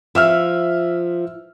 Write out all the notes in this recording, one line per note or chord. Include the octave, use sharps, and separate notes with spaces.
F3 E5 E6 F6